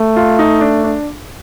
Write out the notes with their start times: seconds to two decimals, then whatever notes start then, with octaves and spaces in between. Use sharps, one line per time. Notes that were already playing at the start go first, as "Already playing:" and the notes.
Already playing: A3
0.16 F4
0.39 D#4
0.61 D4
0.84 D4